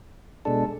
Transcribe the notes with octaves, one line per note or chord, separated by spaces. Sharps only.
B2 G#3 D4 A4